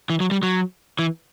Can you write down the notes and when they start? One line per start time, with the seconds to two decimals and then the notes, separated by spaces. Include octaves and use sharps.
0.10 E3
0.20 F#3
0.31 G3
0.43 F#3
0.99 E3